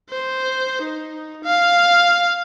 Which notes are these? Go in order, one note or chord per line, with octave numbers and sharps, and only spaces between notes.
C5
D#4
F5